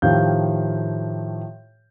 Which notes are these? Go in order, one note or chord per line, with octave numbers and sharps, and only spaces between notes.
A2 D#3 F3 G4 F5 G6